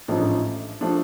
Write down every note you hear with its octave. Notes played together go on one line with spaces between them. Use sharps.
A1 G#2 F3 A3 D4
F3 A3 D4